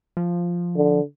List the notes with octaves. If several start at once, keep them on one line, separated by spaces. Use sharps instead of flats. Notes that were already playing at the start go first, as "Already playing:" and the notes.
F3
D3